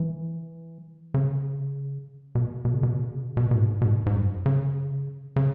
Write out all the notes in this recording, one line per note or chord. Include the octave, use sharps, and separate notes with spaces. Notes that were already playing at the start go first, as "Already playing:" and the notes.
Already playing: E3
C#3
B2
B2
C#3
B2
C#3
B2
C#3
B2
C#3
B2
B2
G#2
B2
G#2
G#2
F#2
C#3
C#3